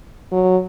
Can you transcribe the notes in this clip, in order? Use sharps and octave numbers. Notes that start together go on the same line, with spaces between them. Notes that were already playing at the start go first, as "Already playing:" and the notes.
F#3